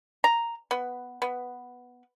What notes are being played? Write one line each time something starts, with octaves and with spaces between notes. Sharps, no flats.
A#5
B3
B3